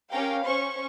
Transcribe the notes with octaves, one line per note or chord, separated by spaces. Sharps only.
C#4 G4 A#4 F5 G5
C#4 C5 C#6